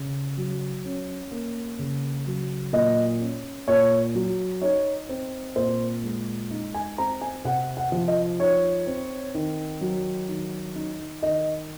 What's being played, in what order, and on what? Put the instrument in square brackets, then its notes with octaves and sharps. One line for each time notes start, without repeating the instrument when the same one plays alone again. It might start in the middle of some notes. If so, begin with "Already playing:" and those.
Already playing: [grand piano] C#3
F#3
C#4
A#3
C#3
F#3
A#2 D#5
C#4
A#2 C#5
F#3
D#4 C#5
C4
A#2 C5
G#3
D#4
G#5
C4 A#5
G#5
C3 F#5
F#5
F3
D#5
D#4 C#5
C4
D#3
F#3
D#3
D#4
D#3 D#5